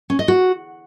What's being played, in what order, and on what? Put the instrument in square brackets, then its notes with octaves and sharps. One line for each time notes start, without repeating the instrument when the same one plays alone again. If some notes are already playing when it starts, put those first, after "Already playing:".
[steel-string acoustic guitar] C#4
D#5
F#4